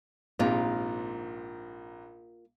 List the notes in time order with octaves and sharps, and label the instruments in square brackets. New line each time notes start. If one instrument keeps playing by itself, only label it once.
[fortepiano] A#1 G#2 C3 [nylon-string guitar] A#3 F4